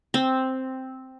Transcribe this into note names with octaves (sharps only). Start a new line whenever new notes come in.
C4